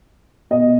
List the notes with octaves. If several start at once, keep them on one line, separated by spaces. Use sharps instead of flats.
B2 D#5